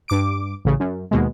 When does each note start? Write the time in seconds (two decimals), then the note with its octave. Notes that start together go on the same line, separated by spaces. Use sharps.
0.08 G2 D6 D7
0.65 A1 C#3
0.80 F#2
1.11 D#2 B2 G#3